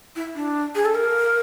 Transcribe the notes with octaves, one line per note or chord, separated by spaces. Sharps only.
E4
D4
G#4
A4
A#4